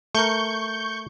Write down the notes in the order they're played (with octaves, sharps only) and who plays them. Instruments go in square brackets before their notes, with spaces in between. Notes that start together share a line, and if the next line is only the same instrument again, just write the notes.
[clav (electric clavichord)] A3 A#4 [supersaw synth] C#6 G6